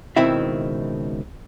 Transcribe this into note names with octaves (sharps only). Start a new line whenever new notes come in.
C#2 B2 D#3 C4 E4 E5